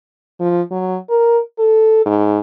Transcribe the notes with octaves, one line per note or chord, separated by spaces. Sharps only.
F3
F#3
A#4
A4
G#2